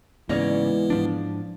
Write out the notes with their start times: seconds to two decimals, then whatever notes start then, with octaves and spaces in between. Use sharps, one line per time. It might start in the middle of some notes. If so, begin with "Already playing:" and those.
0.29 G#2 C#3 E3 G#3 A#3 B3 C#5 D5
0.90 G#2 F3 D4